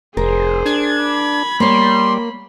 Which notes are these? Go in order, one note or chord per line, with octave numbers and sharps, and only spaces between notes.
F1 G#4 A#4 C5
D4 G#6
B5
G3 A#3 C#5 C6